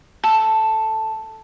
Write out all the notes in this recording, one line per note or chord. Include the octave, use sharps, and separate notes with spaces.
A4